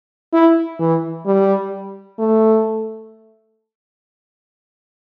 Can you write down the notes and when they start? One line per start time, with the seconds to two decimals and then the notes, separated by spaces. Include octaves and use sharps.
0.33 E4
0.79 E3
1.26 G3
2.19 A3